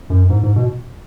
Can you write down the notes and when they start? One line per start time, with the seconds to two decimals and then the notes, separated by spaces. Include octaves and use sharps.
0.10 F#2
0.30 G#2
0.43 G#2
0.56 B2